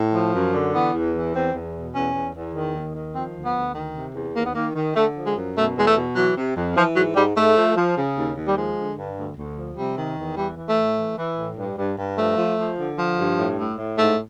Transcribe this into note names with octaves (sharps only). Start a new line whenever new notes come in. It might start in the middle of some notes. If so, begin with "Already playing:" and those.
Already playing: A2
F3
F#2
D3
E3 B3
E2
E3
E2 C4
E2
B2
E2 C#4
E2
E2
D#3
D#2
D#3
F3 C4
D2
B3
D2
D#3
C3
E2
D#2 A#3
B3
D#3 A#3
D#3
D3 A3
F3
G#3
F#2
B2 A3
E2 G#3
A3
B2
E3 F#3
C3
F2
E3 F3
G#2 F#3
G#2 G3
G#2 A3
F3
F3
C#3
D#2
D#2
G3
F3 G#3
D3
G2
D2
D2
F3
C3 G3
D#3
E2
E3 G3
E3
A3
A2
E3
E3
A2
G2
G2
G2
F3 A3
F3
F3
D3
F3
G2
A2
A2
A2
G#2 A3